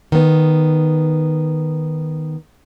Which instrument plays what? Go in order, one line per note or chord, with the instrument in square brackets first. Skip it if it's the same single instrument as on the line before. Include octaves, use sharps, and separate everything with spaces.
[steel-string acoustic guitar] D#3 B3